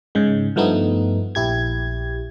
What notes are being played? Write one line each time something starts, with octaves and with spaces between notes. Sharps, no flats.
G#2 C#3 G#3
G2 F3 A3 B3 D#4
A#1 E4 G4 G#6